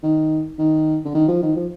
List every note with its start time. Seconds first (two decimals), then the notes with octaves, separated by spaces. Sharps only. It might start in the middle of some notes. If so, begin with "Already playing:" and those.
0.03 D#3
0.59 D#3
1.05 D3
1.15 D#3
1.28 F3
1.43 D#3
1.56 F3